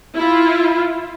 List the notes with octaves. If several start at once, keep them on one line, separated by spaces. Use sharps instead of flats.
E4 F4